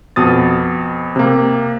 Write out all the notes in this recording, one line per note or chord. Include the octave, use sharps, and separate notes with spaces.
F2 B2 D#6 A6
C3 A#3